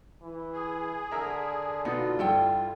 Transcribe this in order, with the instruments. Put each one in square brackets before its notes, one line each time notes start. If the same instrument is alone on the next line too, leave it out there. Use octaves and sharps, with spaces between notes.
[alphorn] E3
[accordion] G#4
[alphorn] D3 [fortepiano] A#4 E5 A#5
[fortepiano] B2 [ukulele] D#4 [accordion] F4
[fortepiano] G2 [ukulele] E4 A4 G5